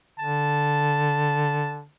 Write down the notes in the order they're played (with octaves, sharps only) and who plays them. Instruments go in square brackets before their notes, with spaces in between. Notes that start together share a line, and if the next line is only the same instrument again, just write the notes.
[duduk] D3 [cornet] A5